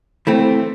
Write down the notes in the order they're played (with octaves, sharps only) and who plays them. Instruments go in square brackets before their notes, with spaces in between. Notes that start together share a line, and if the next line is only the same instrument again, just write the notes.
[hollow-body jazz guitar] E3 A3 C4